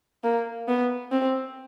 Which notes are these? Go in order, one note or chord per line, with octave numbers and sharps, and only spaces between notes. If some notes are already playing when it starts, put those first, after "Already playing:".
A#3
B3
C4